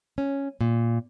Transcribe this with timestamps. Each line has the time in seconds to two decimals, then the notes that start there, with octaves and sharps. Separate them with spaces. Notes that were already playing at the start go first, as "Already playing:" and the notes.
0.18 C#4
0.61 A#2